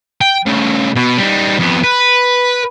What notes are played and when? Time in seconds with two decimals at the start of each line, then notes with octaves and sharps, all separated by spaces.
0.21 G5
0.46 C#3 A3
0.96 B2
1.18 G3 D#4
1.59 F2 B3
1.84 B4